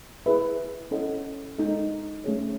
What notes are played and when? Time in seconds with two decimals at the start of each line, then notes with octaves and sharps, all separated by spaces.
0.26 E4 G#4 B4 E5
0.91 C#4 E4 A4 D#5 F#5
1.58 G#3 D#4 A4 D#5
2.24 A3 C#4 G#4 C#5